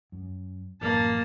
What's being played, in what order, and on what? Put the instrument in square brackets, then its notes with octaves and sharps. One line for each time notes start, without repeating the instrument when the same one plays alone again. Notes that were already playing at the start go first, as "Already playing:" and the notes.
[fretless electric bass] F#2
[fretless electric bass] A1 F#2 [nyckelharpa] A#3 A5